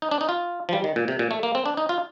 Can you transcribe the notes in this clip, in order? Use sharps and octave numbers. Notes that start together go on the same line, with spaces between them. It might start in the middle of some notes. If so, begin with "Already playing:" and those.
D#4
D4
D#4
F4
F3
G3
D#3
A#2
C3
A#2
A3
A#3
C4
D4
D#4
F4